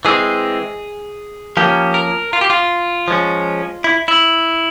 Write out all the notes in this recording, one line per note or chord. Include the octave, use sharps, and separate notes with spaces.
E3 G#3 C4 G#4
F3 A#3 C#4 G4
A#4
F4
G4
F4
F3 G#3 C#4
E4
E4